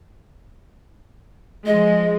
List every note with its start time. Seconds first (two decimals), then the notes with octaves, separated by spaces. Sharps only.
1.66 F3 G#3 D#5